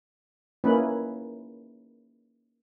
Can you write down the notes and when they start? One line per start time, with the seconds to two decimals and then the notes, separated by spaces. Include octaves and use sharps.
0.64 A#3 C#4 D#4 E4 B4